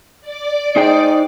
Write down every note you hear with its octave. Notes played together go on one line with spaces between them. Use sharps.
D5 D6
D#4 G#4 C5 D#5 G5